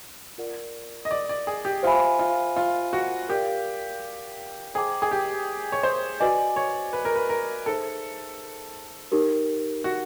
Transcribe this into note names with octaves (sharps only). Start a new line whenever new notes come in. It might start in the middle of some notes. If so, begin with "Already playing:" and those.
F4 A#4 D5 F#5
D#5
D5
D5
G#4
G4
F4 C5 E5 G#5 B5
F4
F4
F#4
G4 A#4 D5 F5
G#4 C5 D#5 G5 A#5 D6
G#4
G4
C#5
C5
F#4 B4 D5 D#5 G#5
C#5
B4
A#4
B4
A#4
D#4 G#4 A4 C5 E5
D#4 G4 A#4
F#4